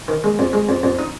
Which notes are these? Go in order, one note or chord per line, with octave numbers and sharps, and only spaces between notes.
D#3
G#3
F2
G#3
F2
F2
D#4